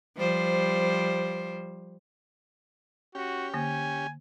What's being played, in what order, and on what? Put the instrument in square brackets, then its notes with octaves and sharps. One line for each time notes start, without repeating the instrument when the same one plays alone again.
[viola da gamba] F3 G3 C5
[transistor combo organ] C#4 G4 [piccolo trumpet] F#4
[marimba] D3 A#3 [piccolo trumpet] G#5